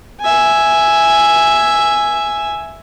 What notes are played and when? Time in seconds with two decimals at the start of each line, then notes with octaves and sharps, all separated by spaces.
0.21 E5 G#5